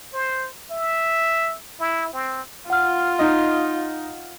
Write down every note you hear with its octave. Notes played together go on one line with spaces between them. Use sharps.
C5
E5
E4
C4
F4 F#5 F6
D#4 D#5